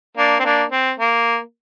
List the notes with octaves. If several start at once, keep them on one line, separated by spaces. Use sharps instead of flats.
A#3 D4
C4
A#3 D4
C4
A#3